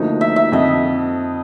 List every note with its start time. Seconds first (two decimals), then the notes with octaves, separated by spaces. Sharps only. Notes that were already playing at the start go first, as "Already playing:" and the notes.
Already playing: D2 D3 F3 A#3 D#4
0.21 E5
0.36 E5
0.52 F2 D3 F3 D#5